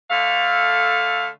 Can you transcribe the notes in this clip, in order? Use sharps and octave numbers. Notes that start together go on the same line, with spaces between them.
D3 A3 F5